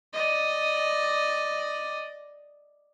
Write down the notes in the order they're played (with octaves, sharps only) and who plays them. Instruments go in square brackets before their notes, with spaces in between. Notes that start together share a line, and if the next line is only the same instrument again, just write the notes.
[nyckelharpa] D5 D#5